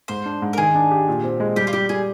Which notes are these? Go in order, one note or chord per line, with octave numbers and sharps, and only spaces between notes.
G#2 C5
D4
G#2
A#4
D#3 G#4
D4
G4
A#2
C4
G#3
G3 G4
F4
G3 G4
G3 G#4